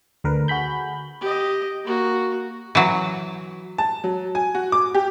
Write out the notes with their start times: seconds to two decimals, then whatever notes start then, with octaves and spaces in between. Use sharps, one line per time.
0.24 D2 D3 A#4 B4
0.48 F#4 G#4 B5 G6
1.21 G4 D#5
1.85 A#3 F#4
2.75 E3 F#3
3.78 A5
4.04 F#3
4.35 G#5
4.55 F#4
4.72 D6
4.95 G4